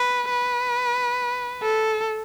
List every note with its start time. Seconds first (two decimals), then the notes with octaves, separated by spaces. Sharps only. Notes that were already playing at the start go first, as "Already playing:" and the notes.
Already playing: B4
0.30 B4
1.63 A4